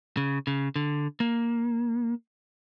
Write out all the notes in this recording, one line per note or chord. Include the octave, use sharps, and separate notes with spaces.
C#3
C#3
D3
A#3